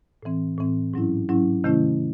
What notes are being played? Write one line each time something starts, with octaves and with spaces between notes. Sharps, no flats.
A2 E3 C4
A2 E3 C4
G#2 F#3 C#4 E4
G#2 F#3 C#4 E4
C3 D#3 A3 C#4 E4